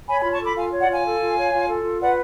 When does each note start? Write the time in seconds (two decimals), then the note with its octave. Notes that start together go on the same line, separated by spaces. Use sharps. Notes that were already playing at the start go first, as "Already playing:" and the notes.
0.08 C#5 G#5 B5
0.20 G#5 B5
0.25 F4
0.33 A5 C#6
0.40 A4 B5 D6
0.56 F4 F5 G#5
0.73 C#5
0.80 D5 F#5
0.89 F4 F5 G#5
1.05 A4
1.20 F4
1.37 C#5
1.53 F4
1.68 A4
1.84 F4
2.01 B4 D5 F#5